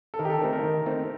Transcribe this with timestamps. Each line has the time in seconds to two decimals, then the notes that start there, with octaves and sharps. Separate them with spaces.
0.14 A4
0.19 D#3 A#4
0.25 G4
0.30 A4
0.41 A3 C4 D#4 A#4
0.53 A#4
0.63 D#3
0.86 A3 C4 D#4